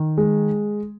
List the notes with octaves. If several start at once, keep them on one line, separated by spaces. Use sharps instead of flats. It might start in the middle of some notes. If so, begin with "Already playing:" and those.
Already playing: D#3
G#3